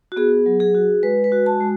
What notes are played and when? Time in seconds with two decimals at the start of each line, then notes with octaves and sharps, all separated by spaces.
0.12 F#4
0.16 B3 G#4
0.46 F#3
0.60 G#4
0.75 F#4
1.03 G#3 B4
1.24 B4
1.32 F#4
1.46 A5
1.61 G#3